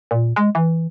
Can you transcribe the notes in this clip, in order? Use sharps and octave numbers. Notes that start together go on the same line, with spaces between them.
A#2
G#3
E3